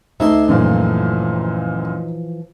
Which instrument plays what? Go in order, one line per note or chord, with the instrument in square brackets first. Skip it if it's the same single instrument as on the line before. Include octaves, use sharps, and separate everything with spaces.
[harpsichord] D2 G#5 C6 [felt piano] D#4 [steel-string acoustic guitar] E5
[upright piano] F#2 A#2 [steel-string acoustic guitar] E3 F3